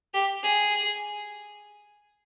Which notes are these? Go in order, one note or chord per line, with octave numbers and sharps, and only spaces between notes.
G4
G#4